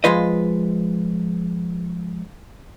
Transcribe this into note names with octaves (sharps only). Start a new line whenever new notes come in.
F3 G#3 F4 B4 D#5